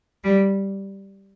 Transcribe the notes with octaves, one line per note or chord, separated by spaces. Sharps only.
G3